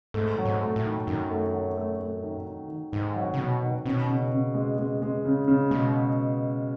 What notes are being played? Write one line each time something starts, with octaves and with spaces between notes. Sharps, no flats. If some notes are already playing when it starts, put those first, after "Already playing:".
G#2 A3
F#3
G#2
A3
A2
D#3
F#2 D#3
A3
F#3
A3
A3
D#3
D#3
D#3
G#2 D#3
F#3
C#3
B2 F#3
D#3
B2 C#4
C#3
C#3
G#3
G#3
G#3
C#3
C#3
B2 G#3